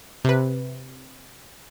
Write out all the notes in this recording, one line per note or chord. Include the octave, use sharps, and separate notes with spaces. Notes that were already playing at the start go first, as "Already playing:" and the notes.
C3 B4